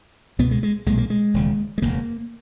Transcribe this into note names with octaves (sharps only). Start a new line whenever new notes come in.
C#2 B2 B3
G#3
G#3
B1 A#2 G#3
A#3
G#3
E1 D#2 C#3
G#3
E1 E2 C#3 A#3